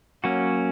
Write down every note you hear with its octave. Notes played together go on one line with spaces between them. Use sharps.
F#3 A#3 C#4 F#4